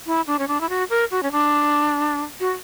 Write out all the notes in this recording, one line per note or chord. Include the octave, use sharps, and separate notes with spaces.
E4
D4
C#4
D4
E4
F#4
A#4
F#4
C#4
D4
F#4